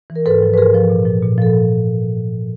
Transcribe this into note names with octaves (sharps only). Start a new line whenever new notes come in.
E3
A#4
G#2 A4 B4
F3
B4
G#2 G#4 A#4
F3
A#2
F3
A#2
F3 A4